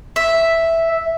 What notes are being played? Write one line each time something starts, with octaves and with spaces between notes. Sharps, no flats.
E5